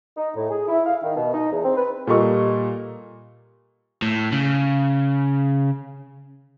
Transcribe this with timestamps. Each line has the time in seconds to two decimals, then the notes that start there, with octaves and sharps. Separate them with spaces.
0.17 D#4
0.35 A2
0.50 G#4
0.68 E4
0.86 F5
1.03 D#3
1.16 B2
1.33 D#4
1.51 E2
1.64 C4
1.77 B4
2.07 A#2 G3 A4 A#4 D#5 C#6
4.02 A2
4.32 C#3